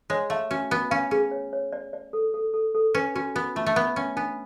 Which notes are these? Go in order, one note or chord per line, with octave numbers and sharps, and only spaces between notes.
G#3 C#5
A3 F5
C#4 F#4
B3 F#4
C#4 F5
C#4 G#4
C#5
C#5
D5
D5
A4
A4
A4
A4
C#4 B4
C#4 F#4
B3 F#4
A3 F4
A3
B3 F#5
C#4 F#5
B3 D4